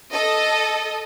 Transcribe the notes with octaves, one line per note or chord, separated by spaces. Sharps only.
A4 D#5